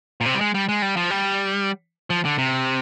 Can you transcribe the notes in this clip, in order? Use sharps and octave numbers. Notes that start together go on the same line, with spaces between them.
A#2
C3
G3
G#3
G3
G#3
G3
F3
G3
F3
D3
C3